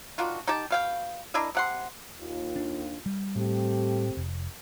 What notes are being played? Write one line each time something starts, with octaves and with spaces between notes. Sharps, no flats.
D#3 D4 F4 F#4
D#4 G4 G5 A5
B2 F5 G5
D4 E4 A#4 D#5
C3 F#5 C6
D#2 F4
D4
G3
A2 A3 C4 G4
F1